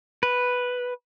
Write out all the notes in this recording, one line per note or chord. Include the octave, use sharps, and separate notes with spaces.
B4